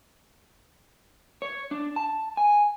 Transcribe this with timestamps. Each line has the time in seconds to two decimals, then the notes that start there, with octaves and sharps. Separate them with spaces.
1.42 C#5
1.71 D4
1.96 A5
2.37 G#5